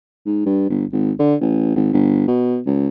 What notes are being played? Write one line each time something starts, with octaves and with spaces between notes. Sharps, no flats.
G#2
G2
G1
G#1
D3
A1
G#1
G1
B2
C#2